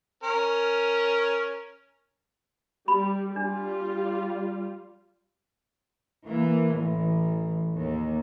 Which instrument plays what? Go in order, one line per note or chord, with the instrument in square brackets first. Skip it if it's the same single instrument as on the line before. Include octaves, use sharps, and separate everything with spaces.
[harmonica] C#4 A#4
[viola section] G3 [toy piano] B5
[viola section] G3 F4 [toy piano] D4
[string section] E3 A#3
A1 E3
D#2